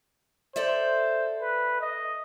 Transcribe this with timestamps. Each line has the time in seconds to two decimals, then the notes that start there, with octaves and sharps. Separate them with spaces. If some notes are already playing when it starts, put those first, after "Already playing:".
0.56 A4 C5 D5 E5
1.42 B4
1.81 D#5